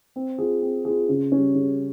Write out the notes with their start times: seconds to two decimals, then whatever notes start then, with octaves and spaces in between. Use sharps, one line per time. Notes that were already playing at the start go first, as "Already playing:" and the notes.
0.16 C4
0.38 F4 G#4
0.62 C4
0.85 F4 G#4
1.09 C#3
1.32 G3 C#4
1.55 C#3